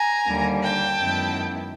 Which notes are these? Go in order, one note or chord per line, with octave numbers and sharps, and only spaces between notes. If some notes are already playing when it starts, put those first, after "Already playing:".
Already playing: G#5 A#5
D#2 D3 G3 A#3
G5 A5
F#2 D#3 G#3 B3 E4